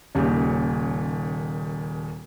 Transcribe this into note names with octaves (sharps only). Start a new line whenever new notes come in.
D#1 D#2 C#3 G4